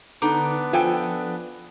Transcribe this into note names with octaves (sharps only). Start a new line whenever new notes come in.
D3 B3 D4 D#4 B4 D6
F3 A4 G5 G#5